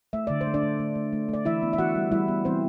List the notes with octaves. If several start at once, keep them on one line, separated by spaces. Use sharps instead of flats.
A3 E5
D3 D5
C5
A3
D4 D5
A3
A3
A3
A3
A3 D5
E3 E4 E5
B3
E5
E3 F#4 F#5
G3
G3 E4 E5
B3
E3 C4 C5